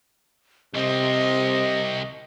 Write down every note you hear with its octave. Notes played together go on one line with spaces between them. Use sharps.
C2 C3 C4 D#5